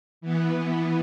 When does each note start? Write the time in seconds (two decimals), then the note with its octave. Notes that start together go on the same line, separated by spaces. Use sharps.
0.21 E3 B3